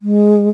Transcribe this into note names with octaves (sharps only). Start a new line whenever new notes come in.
G#3